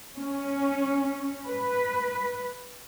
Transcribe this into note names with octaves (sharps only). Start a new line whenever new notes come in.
C#4
B4